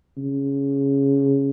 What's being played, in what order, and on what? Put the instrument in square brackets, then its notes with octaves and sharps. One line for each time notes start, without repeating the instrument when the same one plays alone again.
[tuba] C#3